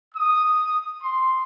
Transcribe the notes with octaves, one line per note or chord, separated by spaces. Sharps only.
D#6
C6